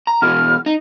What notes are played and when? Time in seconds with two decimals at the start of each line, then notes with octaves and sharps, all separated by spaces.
0.07 A#5
0.22 B2 E3 G#4 F6
0.66 D#4